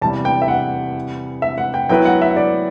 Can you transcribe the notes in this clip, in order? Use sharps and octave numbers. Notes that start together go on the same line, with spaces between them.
E2 C3 G3 A5
G5
E5
F#5
E5
F#5
G5
F#3 B3 E4 B4 G5
F#5
E5
D5